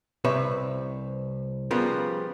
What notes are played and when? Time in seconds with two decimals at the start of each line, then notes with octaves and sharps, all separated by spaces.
0.24 C2 C3 C4 B4 C#5 E5
1.71 C#3 F3 G3 B3 F4 A#4